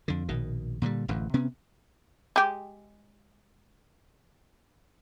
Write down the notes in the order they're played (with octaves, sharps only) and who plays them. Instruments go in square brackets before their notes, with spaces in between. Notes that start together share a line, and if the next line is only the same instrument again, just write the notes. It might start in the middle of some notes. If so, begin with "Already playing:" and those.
[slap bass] F2 D3
A#1 B2 D#3
A#2 D3 E3 G3
D1 A1 F#2
C3 B3 C#4
[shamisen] G#3 G4